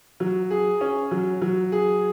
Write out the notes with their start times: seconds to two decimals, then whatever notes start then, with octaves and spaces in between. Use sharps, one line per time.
0.20 F#3
0.50 G#4
0.81 C#4
1.11 F#3
1.42 F#3
1.72 G#4